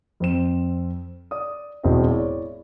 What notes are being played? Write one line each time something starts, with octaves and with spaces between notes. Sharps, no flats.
F2 C4 E7
D5 D#6
E1 A2 C4 F#4 D#5
E4 C#5 D5